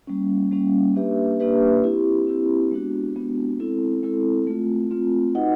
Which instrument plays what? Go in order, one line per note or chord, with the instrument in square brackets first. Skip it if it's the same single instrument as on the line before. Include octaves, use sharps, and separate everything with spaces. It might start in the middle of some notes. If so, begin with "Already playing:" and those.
[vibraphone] G3 A#3 C#4
G3 A#3 C#4
A#3 D4 G4 B4 E5
A#3 D4 G4 B4 E5
C4 E4 G4
C4 E4 G4
G#3 B3 D4 F#4
G#3 B3 D4 F#4
G#3 C4 E4 A4
G#3 C4 E4 A4
A3 C4 F4
A3 C4 F4
D#4 F#4 B4 D#5 F#5